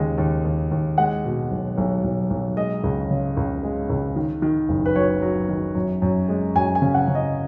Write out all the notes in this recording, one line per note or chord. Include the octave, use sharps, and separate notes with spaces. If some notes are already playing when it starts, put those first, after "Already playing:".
Already playing: D#2 C#3 G#3
D#2
D#2
D#2
G#3 F#5
B2
B1
B1
B1
B1
G#3 D#5
C#2
C#3
C#2
G#3
C#2
D#3
D#3
F#1
B4
F#3 C#5
F#3
D#3
F#2
F#2
G#3
F#2 G#5
G#5
C#3
F#5
C#3
D#5